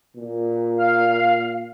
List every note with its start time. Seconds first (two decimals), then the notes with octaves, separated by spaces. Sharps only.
0.17 A#2
0.77 F5